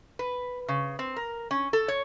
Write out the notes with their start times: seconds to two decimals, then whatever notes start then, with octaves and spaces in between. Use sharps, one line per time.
0.19 B4
0.68 C#3
0.99 C4
1.16 A#4
1.51 C#4
1.73 A4
1.88 C#5